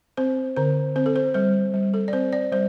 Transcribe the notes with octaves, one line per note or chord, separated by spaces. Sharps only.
C4 C5
D3 C5
C4 C5
A4
C5
G3 C5
G3
A4
D5
C4 C5
D5
G3 C5